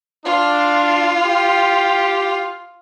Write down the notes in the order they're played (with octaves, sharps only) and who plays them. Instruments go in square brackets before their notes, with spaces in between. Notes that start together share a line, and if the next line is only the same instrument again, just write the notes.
[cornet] D4 [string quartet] F4
[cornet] G4